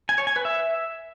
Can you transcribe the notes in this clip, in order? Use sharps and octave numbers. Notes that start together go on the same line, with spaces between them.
G#5
C#5
G#5
B4
E5